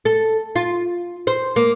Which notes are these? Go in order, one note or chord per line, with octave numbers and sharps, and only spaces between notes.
A4
F4
C5
A#3